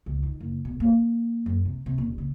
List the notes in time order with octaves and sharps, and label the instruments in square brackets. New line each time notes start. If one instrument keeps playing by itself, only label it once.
[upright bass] C#2
D#3
F#1
B2
A#3
F#2
C3
C3
D#1
C#3